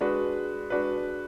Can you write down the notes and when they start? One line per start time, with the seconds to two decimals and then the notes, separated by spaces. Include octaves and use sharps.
0.01 G#3 D4 F#4 B4
0.70 G#3 D4 F#4 B4